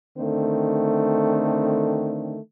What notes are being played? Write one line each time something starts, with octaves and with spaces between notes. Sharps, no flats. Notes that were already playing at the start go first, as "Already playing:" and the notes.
D3 D#3 A3 C4